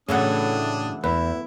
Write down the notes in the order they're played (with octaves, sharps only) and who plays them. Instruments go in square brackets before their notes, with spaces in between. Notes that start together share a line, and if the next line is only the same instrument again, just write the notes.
[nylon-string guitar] A2 [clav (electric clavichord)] C#3 F#5 [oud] E3 F#3 A3 [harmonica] D4 D#6
[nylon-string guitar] E2 [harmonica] E4 [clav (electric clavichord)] B4